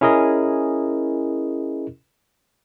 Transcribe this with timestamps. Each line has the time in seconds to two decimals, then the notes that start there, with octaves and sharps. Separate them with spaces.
0.01 C#4 E4 G#4 A#4 D#5